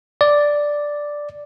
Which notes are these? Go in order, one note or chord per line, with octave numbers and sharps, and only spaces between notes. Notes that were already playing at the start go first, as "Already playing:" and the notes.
D5